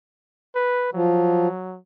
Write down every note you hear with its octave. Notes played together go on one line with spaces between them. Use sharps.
B4
F3 F#3